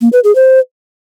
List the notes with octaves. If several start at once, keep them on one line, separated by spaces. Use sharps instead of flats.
A#3
B4
G#4
C5